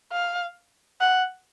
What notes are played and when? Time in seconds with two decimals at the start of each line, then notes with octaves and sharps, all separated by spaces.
0.12 F5
1.00 F#5